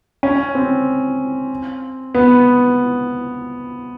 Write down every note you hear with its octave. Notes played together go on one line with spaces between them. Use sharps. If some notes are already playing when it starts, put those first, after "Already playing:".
C#4
C4
B3